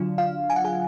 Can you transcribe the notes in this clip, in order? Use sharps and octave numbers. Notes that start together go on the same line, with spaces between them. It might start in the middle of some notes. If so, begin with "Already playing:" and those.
Already playing: D3 F#3 D4 F4
F4 F5
G#5
F#5
G#4 G#5